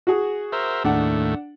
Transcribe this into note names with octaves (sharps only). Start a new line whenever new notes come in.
F#4 G#4
A#4 C5 E5
D#2 A2 A3 D4 F#5